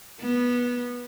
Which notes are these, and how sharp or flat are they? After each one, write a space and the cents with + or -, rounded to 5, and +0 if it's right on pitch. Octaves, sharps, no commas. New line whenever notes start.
B3 -15